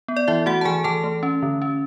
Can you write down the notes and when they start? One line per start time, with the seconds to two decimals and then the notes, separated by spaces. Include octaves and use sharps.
0.08 B3
0.17 D5
0.28 E3 E4 E5
0.46 A3 F#4 F#5
0.61 A5
0.65 E3 G#4 G#5
0.84 E3 A4 A5
1.04 A3
1.23 C#4
1.42 D3
1.62 C#4